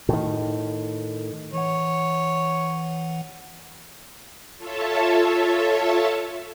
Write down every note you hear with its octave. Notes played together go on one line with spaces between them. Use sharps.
A2 D#3
E3 C#5 F#5
F4 A4 C#5 E5 A5